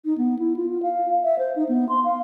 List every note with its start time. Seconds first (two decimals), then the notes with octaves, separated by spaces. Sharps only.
0.05 D#4
0.18 B3
0.39 E4
0.56 F4
0.70 F4
0.83 F5
1.24 E5
1.39 C5
1.56 D#4
1.69 B3
1.89 C6
2.05 F5